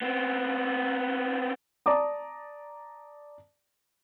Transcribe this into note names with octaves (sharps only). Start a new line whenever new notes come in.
B3 C4
D5 A5 A#5 D6 D#6